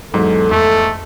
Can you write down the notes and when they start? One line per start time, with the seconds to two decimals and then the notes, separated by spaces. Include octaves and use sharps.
0.14 E2 G#2 F#3 A4
0.51 F2 A3